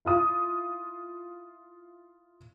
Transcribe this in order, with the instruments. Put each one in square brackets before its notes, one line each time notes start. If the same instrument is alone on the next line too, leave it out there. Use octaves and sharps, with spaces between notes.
[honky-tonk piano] E4 F4 D#6